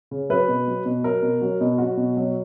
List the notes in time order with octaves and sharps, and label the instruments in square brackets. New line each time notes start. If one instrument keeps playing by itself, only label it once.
[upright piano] C#3
F#3 B4
B2
F#3
B2
F#3 A#4
B2
F#3
B2
F#3 F#4
B2
F#3